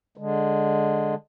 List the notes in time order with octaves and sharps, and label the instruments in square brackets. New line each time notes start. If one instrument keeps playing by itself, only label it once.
[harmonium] D3 G#3